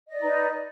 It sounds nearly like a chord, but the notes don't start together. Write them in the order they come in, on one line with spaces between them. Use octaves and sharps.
D#5 D5 D#4 B4